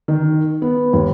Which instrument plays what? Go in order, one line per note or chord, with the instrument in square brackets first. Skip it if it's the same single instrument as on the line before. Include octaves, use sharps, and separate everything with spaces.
[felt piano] D#3
B3
D#2